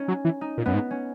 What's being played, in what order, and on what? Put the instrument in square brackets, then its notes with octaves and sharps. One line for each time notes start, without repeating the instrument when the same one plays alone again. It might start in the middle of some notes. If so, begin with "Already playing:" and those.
Already playing: [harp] C#4 D#4
[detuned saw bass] F#3
E3
[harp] D#4
[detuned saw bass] A#2
[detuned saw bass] F#2 [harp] B3
[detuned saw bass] G#2
[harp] C#4